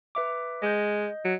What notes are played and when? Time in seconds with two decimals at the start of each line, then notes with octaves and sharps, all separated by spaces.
0.15 B4 E5 D6
0.62 G#3 D#5 G6
1.24 F#3